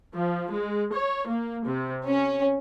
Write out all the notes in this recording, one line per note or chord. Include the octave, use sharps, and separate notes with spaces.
F3
G#3
C#5
A#3
C3
C#4